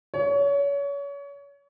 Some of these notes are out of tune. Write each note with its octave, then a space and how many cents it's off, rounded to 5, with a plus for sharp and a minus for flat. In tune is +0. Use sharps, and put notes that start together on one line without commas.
C#5 +30